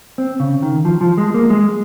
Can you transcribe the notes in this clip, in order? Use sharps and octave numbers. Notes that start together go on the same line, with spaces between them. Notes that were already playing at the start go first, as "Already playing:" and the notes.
C4
C#3
D#3
F3
F3
G#3
A#3
G#3